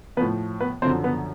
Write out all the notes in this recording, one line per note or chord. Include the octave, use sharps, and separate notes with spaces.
A2 F3 B3 B4
B3 B4
F#2 D3 F3 C4 C5
B3 B4